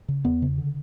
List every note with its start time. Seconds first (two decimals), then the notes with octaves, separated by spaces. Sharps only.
0.08 C#3
0.25 E2 B3
0.42 C#3
0.58 D3